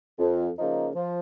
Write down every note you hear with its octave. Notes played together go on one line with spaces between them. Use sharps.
F2
C#3 F3 A#3 D#4
F3